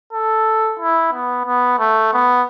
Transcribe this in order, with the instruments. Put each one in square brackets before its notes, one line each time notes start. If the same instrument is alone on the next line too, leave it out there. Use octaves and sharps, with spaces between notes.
[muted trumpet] A4
E4
B3
B3
A3
B3